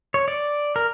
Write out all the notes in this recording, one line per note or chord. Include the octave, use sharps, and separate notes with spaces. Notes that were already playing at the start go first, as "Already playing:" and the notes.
C#5
D5
A#4